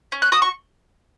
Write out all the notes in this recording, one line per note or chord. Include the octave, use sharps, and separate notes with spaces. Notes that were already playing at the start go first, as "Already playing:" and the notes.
C#4
F#6
F#4 D#6
C#6